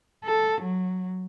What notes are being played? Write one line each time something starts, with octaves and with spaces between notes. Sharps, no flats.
A4
F#3